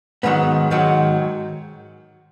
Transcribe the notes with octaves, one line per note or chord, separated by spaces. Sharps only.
G#2 D#3 F#3 B3
G#2 D#3 F#3